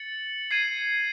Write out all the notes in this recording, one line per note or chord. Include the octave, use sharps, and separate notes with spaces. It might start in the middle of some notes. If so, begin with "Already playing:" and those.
Already playing: A6 C#7 F#7
G#6 C7 D#7